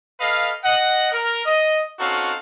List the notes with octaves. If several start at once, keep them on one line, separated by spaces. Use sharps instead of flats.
A4 B4 D#5 F5
D#5 F#5
A#4
D#5
C4 C#4 D#4 F#4 A4 F5